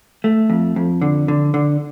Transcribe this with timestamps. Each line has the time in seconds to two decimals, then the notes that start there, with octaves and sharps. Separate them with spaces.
0.24 A3
0.50 F2
0.76 F2
1.02 D3
1.28 D3
1.54 D3